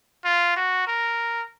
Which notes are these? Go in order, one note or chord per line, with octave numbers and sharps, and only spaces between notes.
F4
F#4
A#4